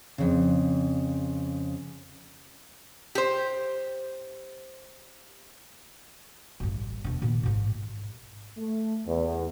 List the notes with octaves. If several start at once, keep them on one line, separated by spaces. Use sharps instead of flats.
F2 C#3
G4 C5
A1 G2
E1 D4
A#2 D#3
A1 G#2
A3
E2